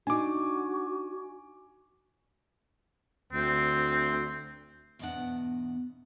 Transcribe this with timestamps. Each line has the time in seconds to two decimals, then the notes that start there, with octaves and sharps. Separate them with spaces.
0.07 D4 D#4 F#4 G#5 D6
3.33 D2 C4
4.99 E2 G#2 B2 B3 D4 F#5